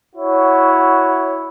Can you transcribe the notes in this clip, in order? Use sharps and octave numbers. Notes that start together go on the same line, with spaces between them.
E4 F#4 C#5